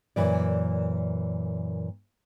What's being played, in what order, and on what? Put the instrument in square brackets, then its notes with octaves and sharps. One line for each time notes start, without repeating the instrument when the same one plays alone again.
[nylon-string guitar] F#2 A#2 E3 D5